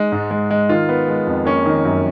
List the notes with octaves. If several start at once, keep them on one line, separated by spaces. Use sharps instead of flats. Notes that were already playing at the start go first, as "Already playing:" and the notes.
Already playing: G#3 D#4
G#2
G#3
G#3
D#3 F4
B3
G#3
F2
A#3 C#4
D#3
F#2